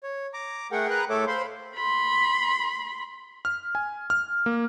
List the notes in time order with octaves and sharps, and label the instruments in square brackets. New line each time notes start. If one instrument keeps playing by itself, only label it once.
[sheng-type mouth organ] C#5
A#5 D6
[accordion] A3 F#5 [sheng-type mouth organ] G#4 A#4 G5
[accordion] B4 A#5 F#6
[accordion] A2 A3 A4 [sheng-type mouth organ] C#5 E5 D6
[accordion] C5 C6 [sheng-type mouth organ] F5 B5
[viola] B5 C6
[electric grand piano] F6
G#5
F6
A#3